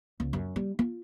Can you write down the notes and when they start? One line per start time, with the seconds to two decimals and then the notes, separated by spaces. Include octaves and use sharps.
0.20 C#2
0.33 F#2
0.56 G3
0.79 F4